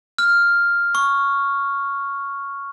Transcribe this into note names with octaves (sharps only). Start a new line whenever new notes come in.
F6
C#6